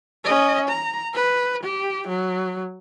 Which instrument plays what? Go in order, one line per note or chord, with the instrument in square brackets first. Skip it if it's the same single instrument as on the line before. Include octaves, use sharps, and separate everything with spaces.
[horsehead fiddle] C#4 D#5
A#5
B4
G4
F#3